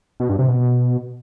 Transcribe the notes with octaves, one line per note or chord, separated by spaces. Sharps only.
B2
G2
C3
B2